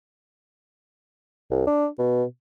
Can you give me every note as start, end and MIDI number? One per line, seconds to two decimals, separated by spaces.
1.51 1.66 36
1.67 1.87 62
1.98 2.24 47